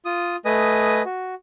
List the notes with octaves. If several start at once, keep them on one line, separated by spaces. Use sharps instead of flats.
F4 D#6
A3 B4 D#5 G#5 D#6
F#4